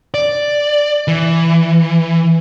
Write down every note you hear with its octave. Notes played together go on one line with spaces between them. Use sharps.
D5
E3